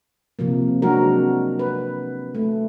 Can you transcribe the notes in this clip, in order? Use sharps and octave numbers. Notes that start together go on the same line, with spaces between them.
C3 F3 A#3
F#3 G#3 C4 D4 F#4 A#4
B4
A3